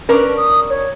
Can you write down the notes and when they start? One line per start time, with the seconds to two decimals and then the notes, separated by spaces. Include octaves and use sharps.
0.09 C#4 D4 A#4 B4
0.37 D#6
0.70 C#5